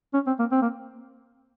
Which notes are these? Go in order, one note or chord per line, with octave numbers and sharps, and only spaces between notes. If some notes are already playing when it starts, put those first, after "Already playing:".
C#4
C4
A#3
C4
A#3